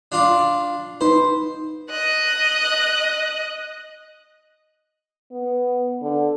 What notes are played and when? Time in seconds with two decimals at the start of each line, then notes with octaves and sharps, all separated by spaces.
0.12 D4 F4 D5
1.01 D#4 B4 C5
1.90 D#5 F#6
5.32 B3
6.02 D3